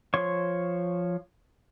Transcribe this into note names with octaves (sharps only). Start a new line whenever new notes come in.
F3 C#5 C6 C#6